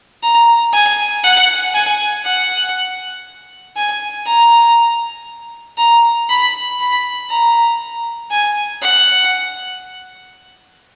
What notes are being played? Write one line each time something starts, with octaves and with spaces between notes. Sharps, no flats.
A#5
G#5
F#5
G#5
F#5
G#5
A#5
A#5
B5
B5
A#5
G#5
F#5